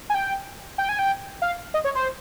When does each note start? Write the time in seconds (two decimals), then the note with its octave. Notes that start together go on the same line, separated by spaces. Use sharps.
0.10 G#5
0.14 G5
0.78 G5
0.89 G#5
0.99 G5
1.42 F5
1.74 D#5
1.84 C#5
1.95 C5